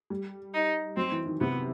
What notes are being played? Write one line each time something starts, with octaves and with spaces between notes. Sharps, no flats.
G3
D#4
F#3 C4
E3
D#3
C3 B3